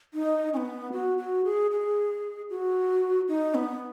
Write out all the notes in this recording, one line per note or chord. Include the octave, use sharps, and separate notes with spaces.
D#4
C#4
B3
F#4
F#4
G#4
G#4
F#4
D#4
B3